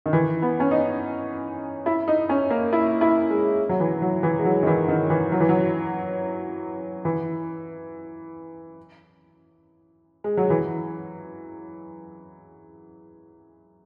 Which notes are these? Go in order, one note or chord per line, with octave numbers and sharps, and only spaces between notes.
D#3
E3
B3
C#4
D#4
E4
D#4
C#4
A#3
E4
E4
G#3
F#3
E3
F#3
E3
G#3
F#3
D#3
E3
D#3
E3
F#3
E3
F#3
E3
G#3
F#3
E3